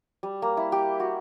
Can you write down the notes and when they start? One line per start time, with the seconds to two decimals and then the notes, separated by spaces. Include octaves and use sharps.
0.23 G3
0.42 A#3
0.57 E4
0.72 G4
1.00 F#4